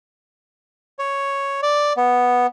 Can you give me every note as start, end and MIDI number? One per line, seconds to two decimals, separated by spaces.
0.99 1.61 73
1.62 1.93 74
1.97 2.47 59